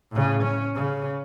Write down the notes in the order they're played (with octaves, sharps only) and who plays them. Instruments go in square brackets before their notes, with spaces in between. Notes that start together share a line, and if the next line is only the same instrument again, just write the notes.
[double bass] A2 C#3
C#4
C#3